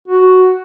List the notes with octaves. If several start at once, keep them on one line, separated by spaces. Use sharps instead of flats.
F#4